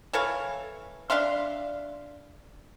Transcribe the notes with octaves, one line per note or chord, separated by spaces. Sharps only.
E3 A4 C#5 F5
D4 E5 F5 C6